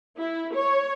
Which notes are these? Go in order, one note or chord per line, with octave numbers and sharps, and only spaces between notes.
E4
C#5